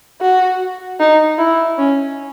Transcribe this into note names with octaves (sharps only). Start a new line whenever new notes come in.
F#4
D#4
E4
C#4